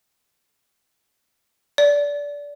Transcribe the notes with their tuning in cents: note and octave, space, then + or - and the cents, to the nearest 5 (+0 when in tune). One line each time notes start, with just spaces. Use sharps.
D5 -20